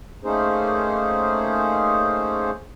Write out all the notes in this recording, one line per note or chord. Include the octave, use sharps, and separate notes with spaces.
A3 A#3 C#4 D#4 G#4 C5